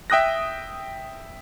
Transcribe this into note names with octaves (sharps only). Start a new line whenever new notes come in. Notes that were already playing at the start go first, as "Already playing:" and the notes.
E5 G5 D#6 F#6 A#6